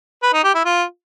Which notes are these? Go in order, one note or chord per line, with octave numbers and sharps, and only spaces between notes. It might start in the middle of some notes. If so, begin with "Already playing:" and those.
B4
D#4
G4
E4
F4